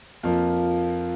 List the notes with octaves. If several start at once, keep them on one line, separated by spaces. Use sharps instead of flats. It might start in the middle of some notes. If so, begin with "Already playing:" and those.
F2 F3 A#3 F4 F5